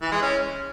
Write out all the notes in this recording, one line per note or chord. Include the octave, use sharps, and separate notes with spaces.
E3
G#3
C#4